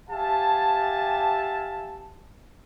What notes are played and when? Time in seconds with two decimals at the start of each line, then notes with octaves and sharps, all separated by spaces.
0.10 G4 E5 F5 G#5 A5